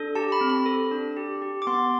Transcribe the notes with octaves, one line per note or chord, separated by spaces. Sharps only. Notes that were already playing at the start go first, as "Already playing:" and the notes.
Already playing: D4 A4
G4 A5
B5
C4
B5
A4
D4
G4
G4
D6
B3 C6